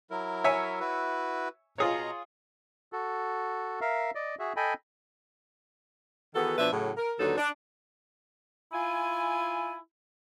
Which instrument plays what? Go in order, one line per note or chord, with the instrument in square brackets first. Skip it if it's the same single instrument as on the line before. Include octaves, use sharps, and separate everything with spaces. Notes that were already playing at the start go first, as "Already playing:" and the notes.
[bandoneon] F#3 E4 A#4
[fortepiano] C#5 E5 G#5
[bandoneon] E4 F#4 B4
[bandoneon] B2 D#5 A#5 [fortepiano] F4 G#4 C#5
[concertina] F#4 A4
A#4 E5 F5
D5 D#5
F#4 G#4 E5
A4 D#5 G5 G#5 B5
[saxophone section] D#3 E3 B3 F#4 G#4 A4
B2 F3 D4 B4 E5
A2 C#3 F#3
A#4
D#2 D3 F#3 D#4 A4 B4
D4
[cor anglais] E4 [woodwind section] F4 G#5